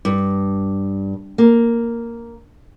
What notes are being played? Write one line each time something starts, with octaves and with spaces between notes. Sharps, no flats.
G2
A#3